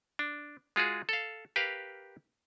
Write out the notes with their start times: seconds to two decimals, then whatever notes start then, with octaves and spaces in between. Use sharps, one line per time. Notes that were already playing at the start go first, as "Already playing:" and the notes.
0.19 D4
0.76 G#3 F4 F#4 G#4
1.09 A4 F5
1.56 G4 A#4 B4 F5